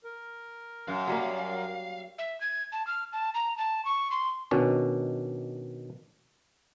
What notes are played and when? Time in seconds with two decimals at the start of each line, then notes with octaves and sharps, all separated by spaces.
0.04 A#4
0.88 F#2 F5
1.07 F#3 G3 A#3
2.18 E5
2.41 G#6
2.72 A5
2.87 F6
3.13 A5
3.34 A#5
3.58 A5
3.85 C#6
4.11 C6
4.51 B2 D#3 C#4 D4